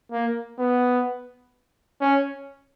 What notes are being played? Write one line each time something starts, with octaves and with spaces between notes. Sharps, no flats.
A#3
B3
C#4